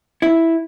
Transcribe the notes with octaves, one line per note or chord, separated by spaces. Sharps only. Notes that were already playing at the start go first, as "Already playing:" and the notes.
E4